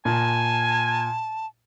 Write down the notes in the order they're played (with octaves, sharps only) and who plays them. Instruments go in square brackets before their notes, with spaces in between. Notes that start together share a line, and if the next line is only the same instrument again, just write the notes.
[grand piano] A#2 [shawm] G#5 [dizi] A5